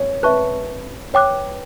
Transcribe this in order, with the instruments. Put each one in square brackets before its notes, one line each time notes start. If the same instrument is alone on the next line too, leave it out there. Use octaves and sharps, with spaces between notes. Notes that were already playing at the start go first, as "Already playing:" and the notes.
Already playing: [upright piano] C#5
[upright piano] B4 [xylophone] E5 A5 C#6 F#6
[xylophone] C#5 G5 D6 F#6